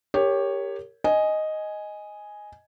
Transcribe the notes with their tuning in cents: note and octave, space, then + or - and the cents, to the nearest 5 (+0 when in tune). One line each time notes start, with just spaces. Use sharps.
G4 +15 A#4 -20 C#5 +0
D#5 +0 G#5 +0